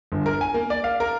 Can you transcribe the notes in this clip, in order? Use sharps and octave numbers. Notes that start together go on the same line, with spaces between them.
G1
A#4
G#5
A#3
D5
F5
A#4